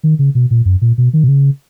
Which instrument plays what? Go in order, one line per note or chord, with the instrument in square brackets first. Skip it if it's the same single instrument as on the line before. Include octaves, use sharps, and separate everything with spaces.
[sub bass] D#3
C#3
B2
A#2
F#2
A#2
B2
D#3
B2
C#3